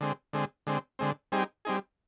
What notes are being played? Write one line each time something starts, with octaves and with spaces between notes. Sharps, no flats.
D3 G#3 C4
D3 G#3 C4
D3 G#3 C4
D3 G#3 C4
G3 C4 D#4 G#4
G3 C4 D#4 G#4